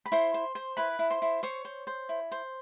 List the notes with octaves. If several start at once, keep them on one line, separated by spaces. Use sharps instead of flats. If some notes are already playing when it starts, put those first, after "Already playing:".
B5
E4 C5 C6
C5
C5
E4 B4 B5
E4
C5 C6
E4
C5 C#5 C#6
C5
C5
E4
C5